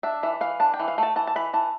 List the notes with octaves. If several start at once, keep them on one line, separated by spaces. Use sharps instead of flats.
D4 E5
E3 E5
E3 F5
D4 A5
G5
E3
F5
A3 A5
E3 A5
A5
E3 B5
E3 A5